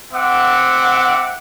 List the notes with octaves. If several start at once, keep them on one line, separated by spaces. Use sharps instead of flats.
C4 E5 F#5 D6